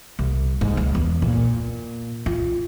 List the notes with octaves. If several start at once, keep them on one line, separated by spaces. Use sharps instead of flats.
C2
G#2
C#2
E2
A#2
F4